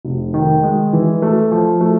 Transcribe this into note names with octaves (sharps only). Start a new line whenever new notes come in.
F1
D#3
G#3
E3
A3
F3
A3